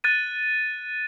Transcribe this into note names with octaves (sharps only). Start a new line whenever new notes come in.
F#6 A6 D#7